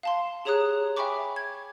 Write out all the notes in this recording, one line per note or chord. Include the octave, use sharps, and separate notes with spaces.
F5 A5 C6
G4 G#4 C#5 A#5 D#6 F#6
E5 G5 G#5 B5 C#6 D6
G#6